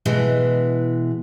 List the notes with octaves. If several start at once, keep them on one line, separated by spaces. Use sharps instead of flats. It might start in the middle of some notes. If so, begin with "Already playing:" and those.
B2 E3 G#3